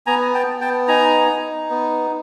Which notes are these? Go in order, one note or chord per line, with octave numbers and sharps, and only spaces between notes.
B3 G#5 A#5
G5 A5
B3
G5 A5
D#4 G#5 A#5
D#4
B3